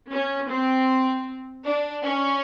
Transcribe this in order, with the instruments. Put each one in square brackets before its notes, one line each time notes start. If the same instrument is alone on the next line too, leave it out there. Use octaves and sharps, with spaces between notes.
[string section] C#4
C4
D4
C#4